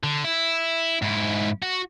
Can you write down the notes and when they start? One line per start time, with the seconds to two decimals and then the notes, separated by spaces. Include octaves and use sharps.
0.03 D3
0.24 E4
1.02 G#2 E4
1.63 F#4